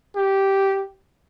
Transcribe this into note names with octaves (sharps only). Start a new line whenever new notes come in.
G4